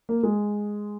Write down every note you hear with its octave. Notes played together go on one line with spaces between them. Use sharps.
A#3
G#3